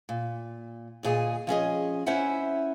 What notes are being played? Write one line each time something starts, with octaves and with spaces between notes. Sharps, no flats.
A#2
D2 A#2 G#4 D#5
F3 C#4 G#4 D#5
C#4 E4 C5 E5 F#5 G#5